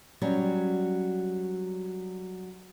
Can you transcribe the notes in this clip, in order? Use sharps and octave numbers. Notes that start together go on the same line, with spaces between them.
F#3 G3 C#4